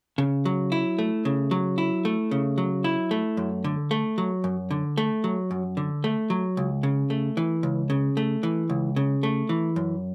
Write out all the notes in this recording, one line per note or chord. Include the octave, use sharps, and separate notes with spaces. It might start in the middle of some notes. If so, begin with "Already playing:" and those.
C#3
F#3
E4
A3
C#3
F#3
E4
A3
C#3
F#3
E4
A3
F#2
D3
A3
F#3
F#2
D3
A3
F#3
F#2
D3
A3
F#3
C#2
C#3
A3
E3
C#2
C#3
A3
E3
C#2
C#3
A3
E3
F#2